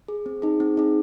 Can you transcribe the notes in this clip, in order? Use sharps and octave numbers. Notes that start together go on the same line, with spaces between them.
G#4
C4
D#4 G#4
C4
D#4 G#4